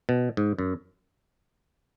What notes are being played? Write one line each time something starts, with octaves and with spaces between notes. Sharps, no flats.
B2
G#2
F#2